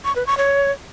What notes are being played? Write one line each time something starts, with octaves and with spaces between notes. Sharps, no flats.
C#6
B4
C#6
C#5